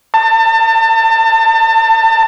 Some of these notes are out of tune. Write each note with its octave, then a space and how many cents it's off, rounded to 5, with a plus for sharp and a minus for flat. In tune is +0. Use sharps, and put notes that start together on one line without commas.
A5 +30